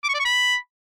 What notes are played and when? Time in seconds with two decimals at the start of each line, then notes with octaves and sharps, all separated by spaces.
0.03 D6
0.09 C#6
0.14 D5
0.20 C#6
0.25 B5